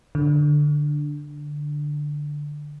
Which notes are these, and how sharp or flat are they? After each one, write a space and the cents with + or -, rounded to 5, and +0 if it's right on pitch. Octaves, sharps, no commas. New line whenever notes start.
D3 +5